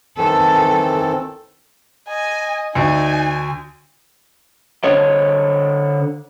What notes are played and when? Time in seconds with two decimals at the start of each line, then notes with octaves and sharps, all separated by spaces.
0.18 D#3 E3 C4 A4
2.09 D#5 G#5
2.75 D2 D#4 G#5
4.84 D3 C5 C#5 D#5